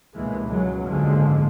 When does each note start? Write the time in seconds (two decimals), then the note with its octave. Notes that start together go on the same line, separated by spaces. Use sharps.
0.14 C#2 G2 B2 E3 G#3 A#3
0.47 C#2 F#3 G#3
0.85 F#1 D#2 G#2 D3 F3 G#3